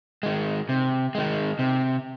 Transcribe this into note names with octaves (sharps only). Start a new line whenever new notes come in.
D#3 G#3
C3
D#3 G#3
C3